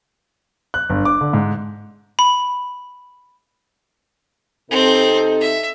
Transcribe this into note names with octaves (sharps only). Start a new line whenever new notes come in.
F#6
G1
D6
D3
G#2
B5
C3 C4 D#4 A4
E5